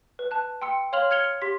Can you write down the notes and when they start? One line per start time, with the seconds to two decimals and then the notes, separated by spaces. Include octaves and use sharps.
0.19 B4
0.31 A5 F#6
0.62 G5 C6 E6 C#7
0.93 C#5 F5 C6 F6 F7 F#7
1.11 F6 G#6 C#7 F7 G7
1.42 G4 C6 B6